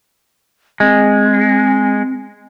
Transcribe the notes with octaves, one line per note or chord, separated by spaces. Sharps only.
G#3 C4